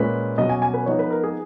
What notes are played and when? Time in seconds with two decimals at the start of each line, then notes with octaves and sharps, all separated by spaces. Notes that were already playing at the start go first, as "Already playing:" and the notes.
Already playing: A#2 G#3 C#4 B4
0.38 B2 F#3 C#4 D#5
0.49 G#5
0.62 G#5
0.74 B4
0.86 F3 B3 D#4 C#5
0.99 B4
1.10 A#4
1.24 G#4